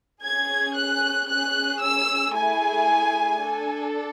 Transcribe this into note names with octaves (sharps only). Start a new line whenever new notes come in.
C#4 G#4 G#6
F#6
C#4 G#4 F#6
E6
A3 E4 G#4 G#5
D4 A4